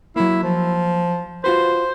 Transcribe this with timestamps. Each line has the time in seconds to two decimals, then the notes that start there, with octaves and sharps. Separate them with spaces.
0.16 F#3 A#3 E4
0.43 F3
1.44 F4 F#4 B4 C5